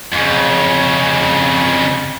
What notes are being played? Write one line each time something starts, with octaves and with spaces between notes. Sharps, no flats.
F2 C#3